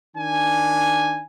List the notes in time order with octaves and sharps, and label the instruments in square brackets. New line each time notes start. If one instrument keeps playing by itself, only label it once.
[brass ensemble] D#3 D4 G#5